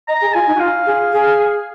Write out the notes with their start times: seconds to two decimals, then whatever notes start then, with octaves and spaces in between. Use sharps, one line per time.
0.08 D#5 A#5
0.21 G#4
0.34 F4 G#5
0.47 D#4
0.56 F#4
0.60 F4 F5
0.86 G#4
1.13 G#4